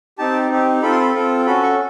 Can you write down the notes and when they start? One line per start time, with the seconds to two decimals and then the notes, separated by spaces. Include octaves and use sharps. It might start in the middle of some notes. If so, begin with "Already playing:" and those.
0.18 C4 D#4 G4 A5
0.51 C4 D#4 G4
0.82 C4 F4 A4 B5
0.92 C6
1.01 B5
1.14 C4 F4 A4
1.46 C#4 F#4 A4 B5
1.63 C#6